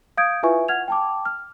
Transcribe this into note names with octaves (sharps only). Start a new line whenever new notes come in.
F5 D#6 G6 G#6 D7
E4 F4 B4 E5 G#5 C#6
F#5 F6 G#6 F7
G5 A5 D6
F6